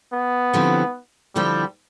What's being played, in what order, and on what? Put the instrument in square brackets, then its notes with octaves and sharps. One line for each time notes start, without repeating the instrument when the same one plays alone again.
[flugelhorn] B3
[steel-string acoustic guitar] D3 F3 C4 E4 G4
[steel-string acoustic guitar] D3 F3 C4 E4 G4 [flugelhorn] G3